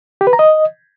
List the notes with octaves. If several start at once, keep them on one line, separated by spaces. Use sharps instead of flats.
G4
B4
A#5
D#5